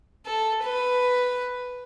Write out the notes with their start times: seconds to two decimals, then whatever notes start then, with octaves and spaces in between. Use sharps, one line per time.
0.26 A4
0.63 B4